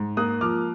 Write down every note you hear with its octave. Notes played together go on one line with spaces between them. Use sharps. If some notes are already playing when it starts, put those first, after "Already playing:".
Already playing: G#2
A#3 D#6 F#6
F3 D6 F6